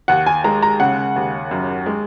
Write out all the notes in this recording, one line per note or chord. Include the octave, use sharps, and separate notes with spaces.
D#2 F#5
G#5
G#3 A#5
A#5
C#3 F#5
D#2
F#2
G#3